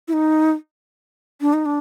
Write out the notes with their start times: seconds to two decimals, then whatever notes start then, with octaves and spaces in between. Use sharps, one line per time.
0.08 E4
0.13 D#4
1.41 D4
1.53 D#4
1.66 D4